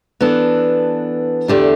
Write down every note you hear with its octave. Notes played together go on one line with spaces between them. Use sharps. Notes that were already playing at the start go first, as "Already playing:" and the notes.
E3 B3 D4 A4
E2 D3 A3 D4 G4